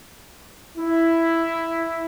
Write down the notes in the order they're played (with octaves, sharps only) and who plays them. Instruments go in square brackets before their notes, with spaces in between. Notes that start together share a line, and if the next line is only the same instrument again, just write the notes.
[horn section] E4